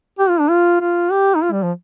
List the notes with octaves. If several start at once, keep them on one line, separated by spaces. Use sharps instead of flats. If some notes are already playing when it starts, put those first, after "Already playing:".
G4
F4
D4
F4
F4
G4
D#4
F4
G3
F3